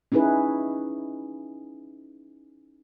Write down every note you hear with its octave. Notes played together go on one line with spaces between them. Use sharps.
C#4 D#4 E4 G#4 B4